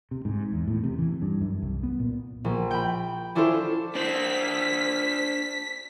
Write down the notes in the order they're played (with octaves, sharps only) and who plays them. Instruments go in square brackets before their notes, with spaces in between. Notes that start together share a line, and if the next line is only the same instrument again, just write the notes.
[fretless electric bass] C3
G#2
E2
A2
C3
E3
G2
F#2
C2
B3
A#2
[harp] A#1
G5 B5
C#4 D4 E4 F4 A4 C5
[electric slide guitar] D4 C5 [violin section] B6